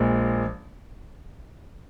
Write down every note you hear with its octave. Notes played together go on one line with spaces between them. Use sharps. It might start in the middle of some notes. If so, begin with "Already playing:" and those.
Already playing: A#1 A#2 G#3